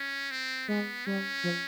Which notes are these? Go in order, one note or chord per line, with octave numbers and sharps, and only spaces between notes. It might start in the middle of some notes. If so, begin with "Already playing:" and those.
Already playing: C#4
C4
G#3 B3
G3 C#4
F3